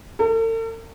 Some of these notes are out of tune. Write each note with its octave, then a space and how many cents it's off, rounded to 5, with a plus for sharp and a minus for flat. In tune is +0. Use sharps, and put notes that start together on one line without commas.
A4 +45